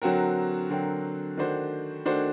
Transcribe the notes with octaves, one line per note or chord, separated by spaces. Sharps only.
D3 F#3 C4 F#4 A#4
D3 F#3 C4 F#4 A#4
D#3 A3 D4 F#4 C5
D#3 A3 D4 F#4 C5